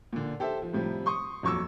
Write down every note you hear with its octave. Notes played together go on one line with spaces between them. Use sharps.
A#2 D3
G4 A4 C5 E5
F3
A2 C3 F3 G3
C6 C#6 D#6
D#1 F2 F#3 C#6 D6 E6